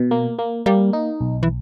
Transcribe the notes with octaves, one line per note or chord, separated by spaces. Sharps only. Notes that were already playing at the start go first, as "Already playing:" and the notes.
Already playing: B2
A#3
A#3
G3 A#3
D#4
B1
E3